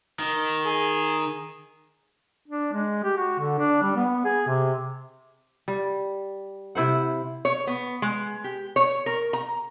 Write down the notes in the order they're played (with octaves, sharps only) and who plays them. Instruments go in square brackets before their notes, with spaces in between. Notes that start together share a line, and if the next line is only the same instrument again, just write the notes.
[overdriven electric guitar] D#3
[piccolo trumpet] G#4
[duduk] D4
G#3
G4
F#4
D3
D4
G3
B3
G#4
C3
[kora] G3
C3 E4 C5 F#5
[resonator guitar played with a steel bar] C#5
B3
G#3
G4
C#5
A#4
A#5